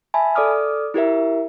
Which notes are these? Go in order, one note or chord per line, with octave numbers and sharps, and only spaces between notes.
E5 G#5 A5 B5
A4 D5 D6 D#6 F6
E4 G4 A#4 E5